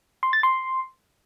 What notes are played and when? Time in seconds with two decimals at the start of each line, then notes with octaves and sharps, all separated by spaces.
0.23 C6
0.33 A6
0.43 C6